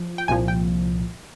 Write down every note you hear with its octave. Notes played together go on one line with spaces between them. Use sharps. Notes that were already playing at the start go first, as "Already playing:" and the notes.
Already playing: F3
G5
C2 A#2 F3 G#5
G5